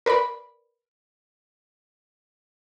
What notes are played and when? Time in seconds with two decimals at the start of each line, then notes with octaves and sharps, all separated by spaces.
0.06 A#4 B4 D5 B5